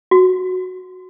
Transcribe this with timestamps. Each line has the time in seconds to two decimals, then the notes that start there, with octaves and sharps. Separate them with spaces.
0.11 F#4